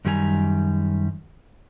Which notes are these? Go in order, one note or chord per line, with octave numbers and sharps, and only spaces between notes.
F#2 D#3 G3 G4 G#5 A#5